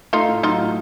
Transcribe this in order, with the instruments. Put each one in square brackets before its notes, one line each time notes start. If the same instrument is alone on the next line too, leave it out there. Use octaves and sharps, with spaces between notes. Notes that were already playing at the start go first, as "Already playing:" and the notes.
[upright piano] A3 [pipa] D#4 F4
[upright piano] A2
[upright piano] F#3 [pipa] D#4 F4
[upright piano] A2